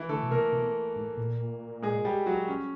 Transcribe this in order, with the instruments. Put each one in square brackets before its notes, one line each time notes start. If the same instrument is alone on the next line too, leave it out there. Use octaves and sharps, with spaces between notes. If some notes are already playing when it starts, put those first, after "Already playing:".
Already playing: [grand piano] E3 E4
[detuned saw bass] D3 [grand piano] A3 A4
[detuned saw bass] B2
[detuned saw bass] C3 [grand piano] A#3 A#4
[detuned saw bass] B2
G#2
A#2
[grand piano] G#3 G#4
G3 G4
F#3 F#4
C#4